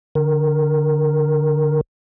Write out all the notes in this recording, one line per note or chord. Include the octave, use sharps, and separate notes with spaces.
D3 A#4